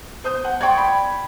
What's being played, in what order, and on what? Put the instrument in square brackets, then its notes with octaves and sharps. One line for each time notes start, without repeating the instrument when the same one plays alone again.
[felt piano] C5 D#6 G6
F#5
[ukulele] D5 G5 [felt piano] C6 C#6 G#6
[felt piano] B5